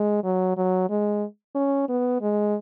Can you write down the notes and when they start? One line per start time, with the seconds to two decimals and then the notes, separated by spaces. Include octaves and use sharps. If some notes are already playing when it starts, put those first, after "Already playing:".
Already playing: G#3
0.24 F#3
0.57 F#3
0.90 G#3
1.55 C#4
1.89 B3
2.21 G#3